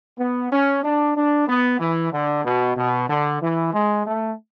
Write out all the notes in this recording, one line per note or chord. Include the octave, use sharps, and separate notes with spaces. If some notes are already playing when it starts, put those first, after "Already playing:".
B3
C#4
D4
D4
B3
E3
D3
B2
B2
D3
E3
G#3
A3